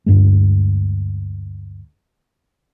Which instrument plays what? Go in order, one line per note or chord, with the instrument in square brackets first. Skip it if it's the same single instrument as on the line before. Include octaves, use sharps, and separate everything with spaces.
[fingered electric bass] D2 G2 G#3